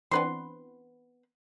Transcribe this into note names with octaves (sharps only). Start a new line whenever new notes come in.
E3 B3 C4 D4 B4 C6